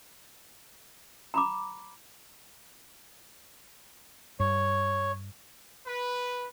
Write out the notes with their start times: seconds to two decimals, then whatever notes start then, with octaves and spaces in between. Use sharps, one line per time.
1.34 A#5 B5 D6
4.40 G2 C#5
5.86 B4